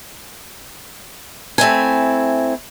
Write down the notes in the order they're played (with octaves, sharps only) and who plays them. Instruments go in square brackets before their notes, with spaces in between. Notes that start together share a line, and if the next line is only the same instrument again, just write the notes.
[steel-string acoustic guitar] A3 C4 E4 G#5